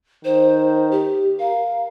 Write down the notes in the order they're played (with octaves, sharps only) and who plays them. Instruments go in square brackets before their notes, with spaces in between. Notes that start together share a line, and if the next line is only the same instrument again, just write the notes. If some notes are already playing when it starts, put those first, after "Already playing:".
[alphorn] D#3 [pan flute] C5
[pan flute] G4
[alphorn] A#4 [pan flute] F5